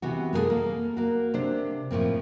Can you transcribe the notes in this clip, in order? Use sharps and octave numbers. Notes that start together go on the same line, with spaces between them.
C3 E3 B3 F#4
G#3 A#3 B3 G#4 A4
A#3
A#3 F#4
C3 D4 C5
A2 F3 A#3 C4